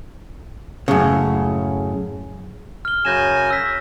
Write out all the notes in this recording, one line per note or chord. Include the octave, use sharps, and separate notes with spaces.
F#2 A2 C#3
F6 G7
F#2 C#3 G#5 G6 A#6 E7
E6 B6